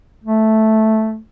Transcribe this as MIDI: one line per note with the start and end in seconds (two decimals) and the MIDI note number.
0.24 1.18 57